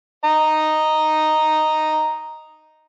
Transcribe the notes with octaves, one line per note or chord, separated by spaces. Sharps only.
D#5 A#5